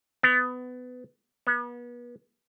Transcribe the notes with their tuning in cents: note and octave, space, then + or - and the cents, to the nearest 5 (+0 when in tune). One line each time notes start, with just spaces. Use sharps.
B3 +20
B3 -35